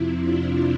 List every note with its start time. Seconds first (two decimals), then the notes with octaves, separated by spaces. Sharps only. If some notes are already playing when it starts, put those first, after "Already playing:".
Already playing: F2 C3 F3 C4 E4
0.20 D4 F4